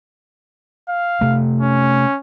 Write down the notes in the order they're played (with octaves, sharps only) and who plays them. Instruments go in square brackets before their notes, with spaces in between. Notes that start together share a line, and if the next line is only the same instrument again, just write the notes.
[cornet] F5
[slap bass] C3 A3
[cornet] C#4